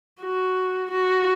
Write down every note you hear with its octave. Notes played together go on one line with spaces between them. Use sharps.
F#4
F#4